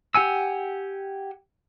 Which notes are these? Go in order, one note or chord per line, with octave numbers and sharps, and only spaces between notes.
G4 F#5 G#5 E6